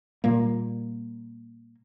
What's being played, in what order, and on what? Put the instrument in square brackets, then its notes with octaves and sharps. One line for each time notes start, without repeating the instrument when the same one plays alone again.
[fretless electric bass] A#2 G3 A#3